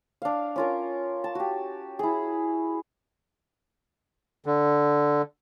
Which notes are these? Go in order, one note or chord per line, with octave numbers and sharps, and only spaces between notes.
D4 F5
C#4 F4 A#4
A5
F#4 G4
E4 G#4
D3